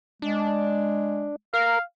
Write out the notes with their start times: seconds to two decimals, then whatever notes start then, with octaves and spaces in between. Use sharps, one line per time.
0.22 G#3 D4
1.54 A#4 F5